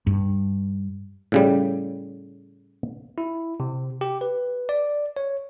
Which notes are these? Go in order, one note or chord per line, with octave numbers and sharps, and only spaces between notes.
G2
A2 C#3 G3
E4
C3
G4
B4
D5
C#5